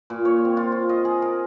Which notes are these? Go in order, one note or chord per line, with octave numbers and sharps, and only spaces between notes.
A#2
C#5
C4
F4
F4
D#5
G#4
A#4